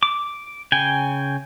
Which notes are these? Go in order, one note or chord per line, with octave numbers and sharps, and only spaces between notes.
D6
C#3 G5 G#5